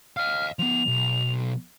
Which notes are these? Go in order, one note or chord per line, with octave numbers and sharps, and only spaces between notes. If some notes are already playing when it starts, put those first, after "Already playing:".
D#5 F5 F6
F3 B3 F7
B1